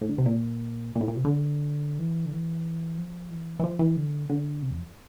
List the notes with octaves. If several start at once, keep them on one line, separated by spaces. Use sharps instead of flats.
A2
D3
C3
A#2
A#2
A2
A#2
C3
D3
E3
D3
E3
F3
E3
E3
F3
E3
D3
D3
C3
E2
F2